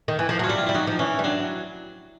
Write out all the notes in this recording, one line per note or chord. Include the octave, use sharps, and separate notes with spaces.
D#3
E3
F3
F#3 F4
G3 E4
F4
G3 E4
F#3 D#4
F3
E3 C#4
G3
F#3 D4